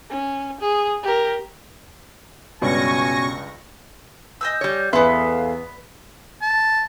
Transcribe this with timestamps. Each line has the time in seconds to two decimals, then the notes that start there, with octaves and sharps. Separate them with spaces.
0.11 C#4
0.61 G#4
1.04 G4 A#4
2.62 C#2 G2 B2 C#4 D5 G#5 C#6 A#6
4.41 D#5 G#5 E6 G6
4.61 G3 C#5
4.93 E2 B3 A4 B4 E5 F5 G#5 C6
6.42 A5